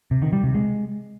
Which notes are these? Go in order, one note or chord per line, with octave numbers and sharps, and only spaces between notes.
C3
D#3
G3
C3
G#3